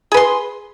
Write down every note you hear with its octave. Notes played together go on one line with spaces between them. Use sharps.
G#4 B4 C6